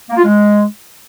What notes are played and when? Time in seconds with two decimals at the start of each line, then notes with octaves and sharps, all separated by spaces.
0.10 A#3
0.17 F4
0.25 G#3